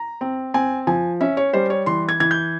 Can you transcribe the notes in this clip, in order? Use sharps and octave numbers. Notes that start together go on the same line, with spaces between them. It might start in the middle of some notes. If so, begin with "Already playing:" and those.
Already playing: A#5
C4
C4 G#5
F3 G#5
C#4 E5
C#5
G3 C5
C#5
E3 C6
G#6
E3 G#6
G6